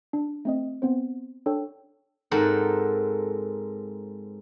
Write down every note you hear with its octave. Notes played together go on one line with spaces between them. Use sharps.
D4
A3 C4 D#5
B3 C4 C5
D4 A4 C#5 G5
G#2 C4 A4 A#4 F#5